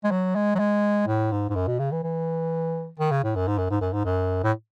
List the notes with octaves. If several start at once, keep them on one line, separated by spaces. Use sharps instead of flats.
G#3
F#3
G#3
F#3
G#3
A2
G#2
G#2
F#2
B2
C#3
E3
E3
D#3
C#3
A2
F#2
G#2
F#2
G#2
F#2
G#2
F#2
A2